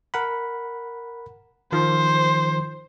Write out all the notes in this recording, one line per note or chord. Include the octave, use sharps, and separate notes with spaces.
A#4 F#5 B5
D#3 F3 C5